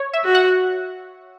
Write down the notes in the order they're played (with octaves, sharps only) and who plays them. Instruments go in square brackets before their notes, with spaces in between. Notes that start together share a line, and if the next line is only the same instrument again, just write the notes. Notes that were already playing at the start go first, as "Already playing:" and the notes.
Already playing: [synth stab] C#5
E5
[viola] F#4
[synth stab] F#5